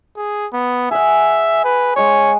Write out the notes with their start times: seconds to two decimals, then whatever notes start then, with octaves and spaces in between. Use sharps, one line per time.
0.17 G#4
0.53 B3
0.91 G#4 E5 F#5
1.65 B4
1.96 G#3 C#5 F#5